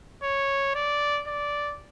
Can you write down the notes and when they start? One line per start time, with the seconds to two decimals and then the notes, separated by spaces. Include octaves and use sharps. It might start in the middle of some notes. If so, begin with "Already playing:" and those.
0.23 C#5
0.75 D5
1.27 D5